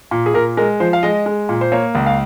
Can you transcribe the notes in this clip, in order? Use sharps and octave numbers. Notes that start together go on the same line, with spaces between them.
A#2
G#4
A#2 A#4
G#3 A#4
F3 C5
F5
G#3 D#5
G#3
A#2
C5
A#3 C#5
C#2
F5